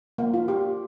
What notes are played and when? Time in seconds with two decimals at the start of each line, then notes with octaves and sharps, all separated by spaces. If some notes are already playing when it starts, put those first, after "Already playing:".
0.18 A#3
0.34 F4
0.48 G4